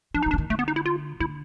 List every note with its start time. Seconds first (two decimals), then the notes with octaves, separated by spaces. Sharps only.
0.14 F3 D4
0.23 D#4
0.26 F3
0.31 D3 D4
0.38 D#3
0.50 D3 A3
0.59 B3
0.68 D#4
0.76 E4
0.86 F4
1.20 D3 E4